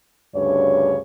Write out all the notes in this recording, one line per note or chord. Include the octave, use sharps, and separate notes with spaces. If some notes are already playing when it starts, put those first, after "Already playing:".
D2 G2 C#3 C#5